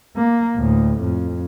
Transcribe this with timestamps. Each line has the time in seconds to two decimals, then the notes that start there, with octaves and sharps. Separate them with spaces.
0.16 A#3
0.56 D2 A2
1.02 F2